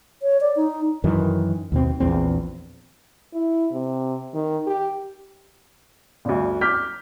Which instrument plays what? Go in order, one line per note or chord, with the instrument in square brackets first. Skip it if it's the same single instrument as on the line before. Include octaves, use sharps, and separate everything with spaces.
[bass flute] C#5
D5
D#4
[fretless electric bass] F#2 D#3 E3
D#2 B2 C4
A#1 E2 C4
[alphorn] E4
C3
D#3
G4
[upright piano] G1 D2
D6 F6 G6 B6